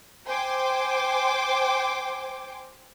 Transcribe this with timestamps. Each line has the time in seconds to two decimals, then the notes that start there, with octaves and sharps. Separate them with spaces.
0.26 C5 G5 G#5 C6 D6